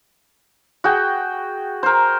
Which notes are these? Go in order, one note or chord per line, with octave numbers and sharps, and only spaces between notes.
F#4 G#4 G5
A#4 C5